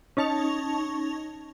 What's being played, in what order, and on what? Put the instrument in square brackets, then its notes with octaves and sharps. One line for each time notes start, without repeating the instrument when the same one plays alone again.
[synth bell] C#4 D#4 A5 C#6 F7